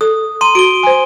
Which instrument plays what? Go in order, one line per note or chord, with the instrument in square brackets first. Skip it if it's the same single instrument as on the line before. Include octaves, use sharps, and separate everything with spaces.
[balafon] A4 [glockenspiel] D#6
[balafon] A#5 [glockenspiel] C6 D#7
[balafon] F#4 [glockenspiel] D7 G7
[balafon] C5 G#5